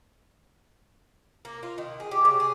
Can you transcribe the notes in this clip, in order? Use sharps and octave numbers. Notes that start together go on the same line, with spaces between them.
A#3
F4
D#3
G#4
G4
C#3
G#4